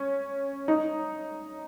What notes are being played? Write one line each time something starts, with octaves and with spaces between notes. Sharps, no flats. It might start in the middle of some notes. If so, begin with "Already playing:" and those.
Already playing: C#4
D#4